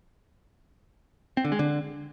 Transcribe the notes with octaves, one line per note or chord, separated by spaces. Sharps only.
C4
D3
G#3
D3